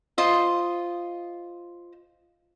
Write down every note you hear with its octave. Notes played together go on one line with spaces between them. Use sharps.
F4 C5 D#5 C6